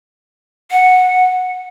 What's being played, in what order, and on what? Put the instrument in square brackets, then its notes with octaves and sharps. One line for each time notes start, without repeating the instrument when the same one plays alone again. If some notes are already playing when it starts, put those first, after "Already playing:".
[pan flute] F#5